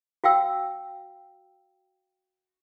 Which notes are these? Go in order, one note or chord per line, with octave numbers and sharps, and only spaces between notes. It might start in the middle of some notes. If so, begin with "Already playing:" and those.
F#4 F5 G5 E6